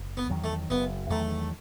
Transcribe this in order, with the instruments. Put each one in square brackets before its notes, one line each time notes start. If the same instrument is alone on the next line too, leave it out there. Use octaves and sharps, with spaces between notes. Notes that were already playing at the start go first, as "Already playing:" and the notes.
Already playing: [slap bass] F#1
[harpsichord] B3
[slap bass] E2 D#3 F#3
[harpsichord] A3
[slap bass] F#1 [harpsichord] B3
[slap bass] E2 D#3 F#3 [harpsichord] A3